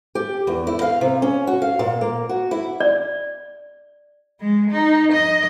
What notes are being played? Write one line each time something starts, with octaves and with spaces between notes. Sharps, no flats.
G4
E2
E4
F5
C3
C#4
F#4
F5
A#2
A#3
F#4
E4
D5
G#3
D#4
D#5